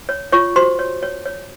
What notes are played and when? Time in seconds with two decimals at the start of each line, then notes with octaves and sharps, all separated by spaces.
0.09 C#5
0.32 F4 C#5 C#6
0.56 F#4 C5 C6
0.79 C#5
1.03 C#5
1.26 C#5